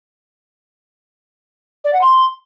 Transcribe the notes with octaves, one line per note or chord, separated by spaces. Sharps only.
D5
F#5
C6